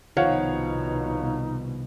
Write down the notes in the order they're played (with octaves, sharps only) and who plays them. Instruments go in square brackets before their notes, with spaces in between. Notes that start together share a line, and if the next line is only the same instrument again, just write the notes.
[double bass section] C2 B2 [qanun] D#3 F3 [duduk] D#4 [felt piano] C#5 F5 F#5